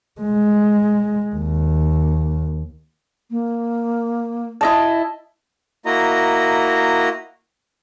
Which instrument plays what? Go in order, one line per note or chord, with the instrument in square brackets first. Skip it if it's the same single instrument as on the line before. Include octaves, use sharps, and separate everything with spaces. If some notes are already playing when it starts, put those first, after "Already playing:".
[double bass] G#3
D#2
[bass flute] A#3
[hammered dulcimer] E4 D#5 A5
[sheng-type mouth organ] A#3 E4 F#4 D#5 A#5